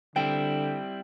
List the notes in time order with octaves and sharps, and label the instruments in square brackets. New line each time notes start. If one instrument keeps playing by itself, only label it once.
[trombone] D3 [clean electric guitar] G3 C4 E4 [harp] G5